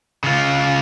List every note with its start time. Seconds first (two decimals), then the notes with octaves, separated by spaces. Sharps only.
0.24 C#3 F4